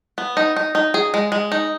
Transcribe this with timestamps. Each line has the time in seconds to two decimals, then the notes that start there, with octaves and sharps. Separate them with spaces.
0.18 B3
0.37 D#4
0.57 D#4
0.75 D#4
0.94 G#4
1.14 G#3
1.32 G#3
1.52 D#4